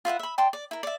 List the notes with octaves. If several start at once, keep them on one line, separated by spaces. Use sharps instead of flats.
F4 B4 E5 F#5
E5 B5
D5 G5 A5 C6
D5
E4 A#4
D5 E5